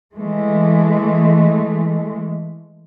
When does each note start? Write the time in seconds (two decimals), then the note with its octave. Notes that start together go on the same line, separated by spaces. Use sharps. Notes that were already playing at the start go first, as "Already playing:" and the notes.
0.14 E3 G#3 A3